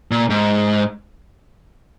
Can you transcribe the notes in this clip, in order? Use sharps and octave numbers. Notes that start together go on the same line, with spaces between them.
A#2
G#2